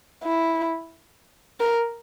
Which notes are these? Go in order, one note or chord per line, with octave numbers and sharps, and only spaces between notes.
E4
A#4